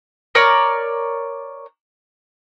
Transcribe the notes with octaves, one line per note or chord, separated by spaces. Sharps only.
A#4 C#5 D5